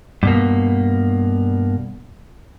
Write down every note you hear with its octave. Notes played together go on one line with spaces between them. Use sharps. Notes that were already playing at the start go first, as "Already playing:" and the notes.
G2 B2 A#3